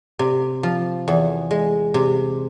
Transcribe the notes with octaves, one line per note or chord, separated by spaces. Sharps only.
C3
F3
E2
G#3
C3